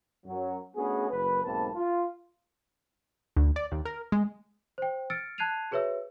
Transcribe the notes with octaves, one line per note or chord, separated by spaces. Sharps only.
F#2 F#3
A3 B3 C#4 D4 F#4 G#4
F#1 B4
B1 G#2 A#3 C4 B4 A5
F4
D2
D5
D#2
A#4
G#3
C5 G5
E6 F6 A6 C#7 D7
A5 F#6 G#6 C7 D#7 F7
F#4 G#4 B4 C#5 E5 E6